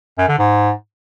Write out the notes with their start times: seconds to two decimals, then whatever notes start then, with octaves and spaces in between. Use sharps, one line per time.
0.18 F#2
0.28 D3
0.38 G#2